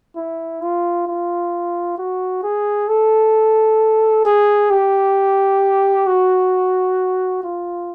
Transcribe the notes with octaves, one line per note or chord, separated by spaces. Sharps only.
E4
F4
F4
F#4
G#4
A4
G#4
G4
F#4
F4